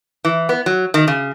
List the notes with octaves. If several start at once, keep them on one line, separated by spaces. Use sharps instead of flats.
E3
B3
F#3
D#3
C#3